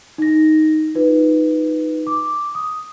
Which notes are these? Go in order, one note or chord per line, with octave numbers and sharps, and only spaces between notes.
D#4 A#6
D#4 F4 B4
D6
D#6